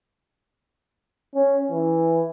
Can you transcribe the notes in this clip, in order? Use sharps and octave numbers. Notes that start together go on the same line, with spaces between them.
C#4
E3